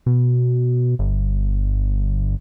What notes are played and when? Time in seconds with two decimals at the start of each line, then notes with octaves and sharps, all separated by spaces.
0.06 B2
0.99 G1